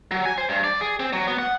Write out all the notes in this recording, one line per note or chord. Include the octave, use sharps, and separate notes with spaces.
F#3
G#5
C5
G2
D5
G#4
C4
F#3
B3
F#5